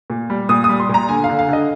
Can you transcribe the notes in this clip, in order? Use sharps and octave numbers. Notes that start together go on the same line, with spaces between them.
A#2
G3
A#2 D#6
D#6
G3
C6
A#2
A#5
D3 G#5
F5
D3
F5
D3 D#5